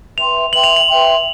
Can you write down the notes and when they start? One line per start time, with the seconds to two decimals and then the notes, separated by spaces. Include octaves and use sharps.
0.17 B4 E5 G5 C6 F7
0.52 B4 E5 G5 C6 F#7
0.64 F7
0.76 F#7
0.87 B4 E5 G5 C6